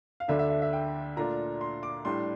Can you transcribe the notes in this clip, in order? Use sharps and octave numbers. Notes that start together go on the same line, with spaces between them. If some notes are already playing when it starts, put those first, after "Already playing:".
F5
D2 D3 A3 D4 E5
E5
E5
E5
G5
A#2 A3 D4 F4 A#5
C6
D6
A2 G3 D4 C6